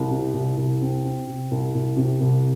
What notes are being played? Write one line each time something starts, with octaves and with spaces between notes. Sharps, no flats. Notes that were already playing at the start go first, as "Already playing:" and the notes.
Already playing: C2
C3
C2
C2
C4
C4
C3
C2
C2
C3
C2